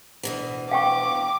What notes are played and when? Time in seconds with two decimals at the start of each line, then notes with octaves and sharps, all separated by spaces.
0.23 D2 B2 E3
0.71 F5 G5 C#6 D6